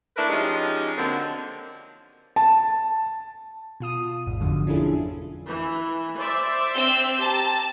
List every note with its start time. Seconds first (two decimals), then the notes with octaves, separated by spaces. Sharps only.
0.16 A3 D4 E4 A#4 B4
0.29 F3 G#3 C#4 D#4 G4
0.97 D3 F#3 A#3 C4
2.36 A5
3.80 B2 F4 D#6 D#7
4.27 G#1 E2 G#2
4.40 F2 B2 D3 F3 F#3
4.67 C#4 D4 E4 F4 G#4 A4
5.47 E3
6.17 C5 D5 E5
6.76 C4 E6 G6
7.19 G4 A5 A#5